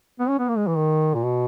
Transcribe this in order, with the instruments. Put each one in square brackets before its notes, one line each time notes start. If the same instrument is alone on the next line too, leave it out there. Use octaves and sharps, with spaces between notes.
[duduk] B3
C#4
B3
A#3
G#3
E3
D#3
A#2
B2